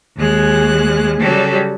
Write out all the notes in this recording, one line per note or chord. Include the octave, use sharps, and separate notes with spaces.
D#2 G#3 F#6
C#3 F#3 G3 G4 A4